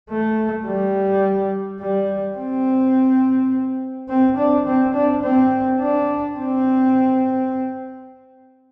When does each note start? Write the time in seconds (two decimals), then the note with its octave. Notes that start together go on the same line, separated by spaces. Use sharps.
0.10 A3
0.66 G3
1.80 G3
2.38 C4
4.09 C4
4.37 D4
4.66 C4
4.94 D4
5.23 C4
5.80 D4
6.37 C4